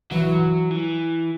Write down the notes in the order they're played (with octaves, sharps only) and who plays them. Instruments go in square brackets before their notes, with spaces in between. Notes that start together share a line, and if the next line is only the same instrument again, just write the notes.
[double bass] E3 [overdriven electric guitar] F#3
[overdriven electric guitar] E3